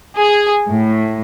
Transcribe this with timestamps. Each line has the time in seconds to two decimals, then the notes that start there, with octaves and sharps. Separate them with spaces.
0.17 G#4
0.69 A2